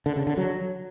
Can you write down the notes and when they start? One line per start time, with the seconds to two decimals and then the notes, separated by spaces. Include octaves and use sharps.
0.06 D3
0.16 C#3
0.27 D3
0.37 F#3